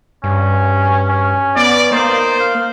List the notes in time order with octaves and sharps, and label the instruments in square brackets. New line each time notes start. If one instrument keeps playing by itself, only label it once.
[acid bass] G2 [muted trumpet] C#4
[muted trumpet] C#4
[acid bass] B3 [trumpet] D5
[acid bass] A#3 [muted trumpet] D#4 [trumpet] C5
[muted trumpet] F5